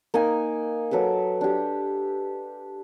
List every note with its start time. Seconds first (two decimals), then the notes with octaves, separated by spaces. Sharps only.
0.14 A#3 D#4 A#4 G#5
0.91 F#3 A4 B4 D6
1.41 D4 G4